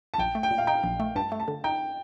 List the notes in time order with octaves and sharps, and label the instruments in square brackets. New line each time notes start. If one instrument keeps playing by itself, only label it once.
[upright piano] A5
[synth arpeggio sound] A#1 [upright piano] G5
[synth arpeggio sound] A3
[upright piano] G5
[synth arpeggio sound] A#2
[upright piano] F5
[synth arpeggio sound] D#4 [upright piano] G5
[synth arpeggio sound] A#1
A3
[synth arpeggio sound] G2 [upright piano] A5
[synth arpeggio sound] A3
[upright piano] A5
[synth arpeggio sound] D3
[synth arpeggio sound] D#4 [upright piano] G5